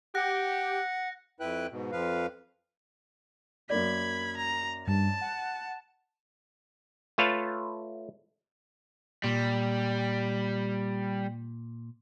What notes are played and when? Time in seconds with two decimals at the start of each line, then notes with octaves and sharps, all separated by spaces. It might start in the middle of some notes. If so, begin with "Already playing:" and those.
0.15 G4 F#5 F#6 A#6
1.40 F2 E4 B4 G5 F#6
1.70 G#2 B2
1.92 F2 F3 B4 F5
3.70 F#2 A#3 D5 B5 G#6
4.37 A#5
4.87 G2 A5
5.21 F#5
7.18 A3 F4 B4 C#5 F5 A5
9.24 A#2 G3